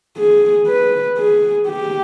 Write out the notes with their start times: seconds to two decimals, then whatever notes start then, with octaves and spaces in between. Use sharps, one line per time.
0.17 G#4
0.67 B4
1.18 G#4
1.68 G4